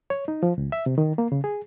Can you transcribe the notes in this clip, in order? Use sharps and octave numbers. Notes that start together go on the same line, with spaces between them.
C#5
D#4
F3
C#2
E5
C3
D#3
A#3
C#3
G#4